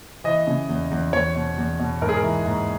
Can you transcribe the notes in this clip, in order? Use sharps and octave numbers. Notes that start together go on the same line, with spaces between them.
E3 D#5
C#3
E2
E2
E2 C#5
B2
E2
B2
G#2 A#4
G#4
A#4
E3
G#2